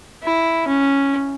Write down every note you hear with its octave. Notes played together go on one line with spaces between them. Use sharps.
E4
C#4